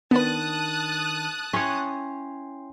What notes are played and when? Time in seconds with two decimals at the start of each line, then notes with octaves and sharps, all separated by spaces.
0.11 D#3 B3 D4 B4 A5 D#6 F#6 A6
1.53 C#4 E4 C#5 G5 C6